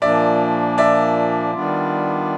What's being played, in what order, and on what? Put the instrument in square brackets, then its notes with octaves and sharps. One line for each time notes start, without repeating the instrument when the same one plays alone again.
[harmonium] A#2 F3 A#3 D4 [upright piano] D5 E5
[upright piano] D5 E5
[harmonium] D#3 G3 B3 D4 F4